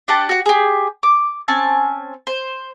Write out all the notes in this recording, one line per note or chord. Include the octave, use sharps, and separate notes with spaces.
D4 G4 F#5 A5
F#4 F#5
G4 G#4
D6
C4 C#4 G#5 A5
C5